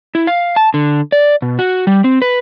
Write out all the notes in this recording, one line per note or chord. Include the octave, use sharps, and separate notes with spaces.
E4
F5
A5
D3
D5
B2
F#4
G3
C4
B4